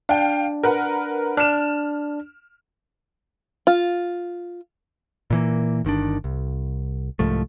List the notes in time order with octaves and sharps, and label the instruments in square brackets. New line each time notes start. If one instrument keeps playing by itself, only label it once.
[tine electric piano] D4 [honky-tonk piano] F5 G5
[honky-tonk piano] A#4 B4 F#5
[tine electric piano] D4 [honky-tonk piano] F6 E7
[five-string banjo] F4
[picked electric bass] A#2 E3 A#3
G1 D#3 C#4 D4
C2
C2 G#2 F3 A3